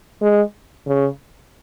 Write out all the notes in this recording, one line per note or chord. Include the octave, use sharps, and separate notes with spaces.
G#3
C#3